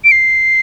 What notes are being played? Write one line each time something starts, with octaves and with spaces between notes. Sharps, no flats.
D7
C7